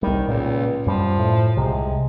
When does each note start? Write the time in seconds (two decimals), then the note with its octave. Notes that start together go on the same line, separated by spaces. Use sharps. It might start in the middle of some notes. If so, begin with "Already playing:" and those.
0.03 C2 D#3 G3
0.28 C#2 A#2
0.87 F#2 F3 G3
1.19 A2
1.57 C2 C3 G#3